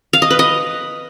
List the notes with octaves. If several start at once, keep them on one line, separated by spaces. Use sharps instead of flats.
F5
D#5
B4
D#5